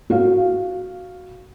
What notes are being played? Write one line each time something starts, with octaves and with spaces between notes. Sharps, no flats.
F#4 F5